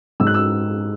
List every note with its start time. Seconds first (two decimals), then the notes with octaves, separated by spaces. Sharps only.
0.20 G#2 E6
0.27 F#6
0.34 E6